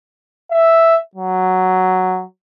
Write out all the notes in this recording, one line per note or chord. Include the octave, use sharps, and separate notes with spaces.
E5
F#3